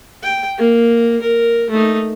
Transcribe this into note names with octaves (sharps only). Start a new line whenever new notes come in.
G5
A#3
A#4
A3 D#4